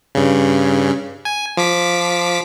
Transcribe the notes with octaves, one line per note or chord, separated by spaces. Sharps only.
G2 C#3
G#5
F3 D6 B6